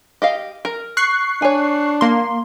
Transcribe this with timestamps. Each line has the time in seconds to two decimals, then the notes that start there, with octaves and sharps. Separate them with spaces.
0.22 G4 D#5 F5
0.65 A#4
0.97 C#6 F#6 C7
1.42 D4 C#5 G#5
2.01 A#3 C6